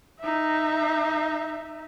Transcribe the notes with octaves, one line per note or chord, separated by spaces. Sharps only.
D#4 E5